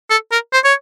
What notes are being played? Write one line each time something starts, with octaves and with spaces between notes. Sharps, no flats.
A4
A#4
C5
C#5